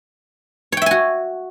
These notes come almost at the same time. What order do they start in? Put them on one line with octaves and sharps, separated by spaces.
C#5 G5 E5 G#5 F#4